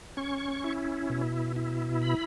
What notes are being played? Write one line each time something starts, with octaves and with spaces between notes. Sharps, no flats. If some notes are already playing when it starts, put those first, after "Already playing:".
C#4 C#6
E4
B2
E4
B5